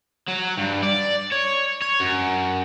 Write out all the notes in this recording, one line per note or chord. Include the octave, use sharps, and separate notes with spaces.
F#3
G2
D5
C#5
C#5
F#2